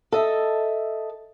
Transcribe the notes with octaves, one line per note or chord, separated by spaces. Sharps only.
A4 D#5 E5